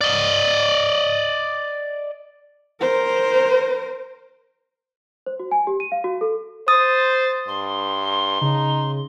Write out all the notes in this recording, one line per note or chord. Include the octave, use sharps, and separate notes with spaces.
D5 D#5
A#4 C5
C5
F#4
G#5
G4
D#7
F5
F#4
A4
C5 D#6 A6
G2 C6
C#3 D#4